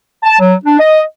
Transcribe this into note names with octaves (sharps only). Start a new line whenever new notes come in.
A5
F#3
D4
D#5